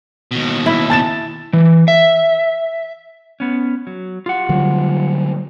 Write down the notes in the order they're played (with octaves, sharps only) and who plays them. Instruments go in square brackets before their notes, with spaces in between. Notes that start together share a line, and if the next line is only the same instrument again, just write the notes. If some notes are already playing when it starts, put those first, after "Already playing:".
[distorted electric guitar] D#2 B2
[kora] E4
[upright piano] A5 A6 E7
[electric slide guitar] E3
E5
B3 C#4
F#3
F4 G4 F#5
[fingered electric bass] D3 F#3 G3